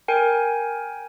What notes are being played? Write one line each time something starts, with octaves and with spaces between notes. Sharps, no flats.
A#4 G5 G#5